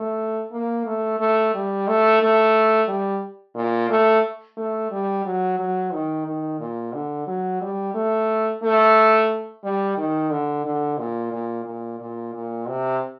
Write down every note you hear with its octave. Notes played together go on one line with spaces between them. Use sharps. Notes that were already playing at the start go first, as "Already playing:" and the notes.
Already playing: A3
A#3
A3
A3
G3
A3
A3
G3
A#2
A3
A3
G3
F#3
F#3
D#3
D#3
A#2
D3
F#3
G3
A3
A3
G3
D#3
D3
D3
A#2
A#2
A#2
A#2
A#2
C3